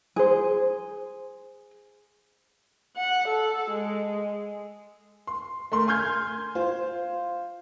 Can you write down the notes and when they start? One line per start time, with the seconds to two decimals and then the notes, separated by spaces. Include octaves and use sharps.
0.16 G#4 C5
2.97 F#5
3.29 A4
3.71 G#3
5.27 C6
5.72 A3 A#4 C6
5.87 G#5 C6 F6 G6 G#6
6.55 F4 C5